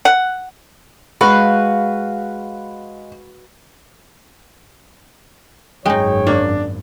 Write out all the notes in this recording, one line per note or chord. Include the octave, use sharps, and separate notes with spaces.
F#5
G#3 F#4 B4 F5
G#1 F#2 G#3 D#4 C#5 G5
A#3 D4